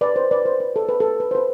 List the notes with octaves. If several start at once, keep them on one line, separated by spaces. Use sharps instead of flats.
B4 D5
C5
B4 D5
C5
B4
A4
B4
A4
B4
C5
B4